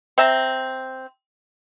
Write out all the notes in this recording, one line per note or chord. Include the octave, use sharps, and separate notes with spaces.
C4 E5 A#5